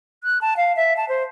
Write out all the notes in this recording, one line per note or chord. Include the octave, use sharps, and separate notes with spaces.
F#6
A5
F5
E5
A5
C5